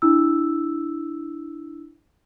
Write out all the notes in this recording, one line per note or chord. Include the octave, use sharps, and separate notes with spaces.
D4 E4 E6